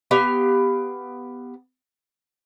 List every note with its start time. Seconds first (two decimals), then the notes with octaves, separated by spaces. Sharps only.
0.11 B3 G4 F5